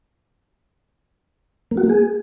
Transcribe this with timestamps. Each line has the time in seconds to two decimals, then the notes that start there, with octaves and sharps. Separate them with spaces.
1.71 A#3
1.77 F#4
1.83 A#3
1.89 G#4